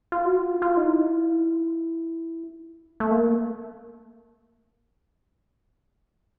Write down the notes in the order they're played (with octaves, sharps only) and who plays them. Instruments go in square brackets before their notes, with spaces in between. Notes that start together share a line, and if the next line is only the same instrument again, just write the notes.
[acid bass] F4
F#4
F4
F4
D#4
E4
A3
A#3